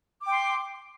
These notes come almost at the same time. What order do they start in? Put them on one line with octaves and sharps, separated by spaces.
D6 G5 C6